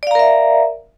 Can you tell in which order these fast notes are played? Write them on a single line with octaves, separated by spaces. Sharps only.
D5 F5 A#5 A#4 E5